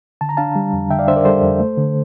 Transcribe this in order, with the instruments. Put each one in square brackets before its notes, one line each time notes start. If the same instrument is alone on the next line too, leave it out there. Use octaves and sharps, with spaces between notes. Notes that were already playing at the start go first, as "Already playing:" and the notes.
[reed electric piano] D3 A5
A#5
D4 F5 A5
G3
F2
D3 E5 G5
D5 F5
D4 C5 E5
A#4 D5
G3 A4 C5
F2
A3
D3